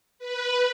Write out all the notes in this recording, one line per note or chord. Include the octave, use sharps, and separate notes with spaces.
B4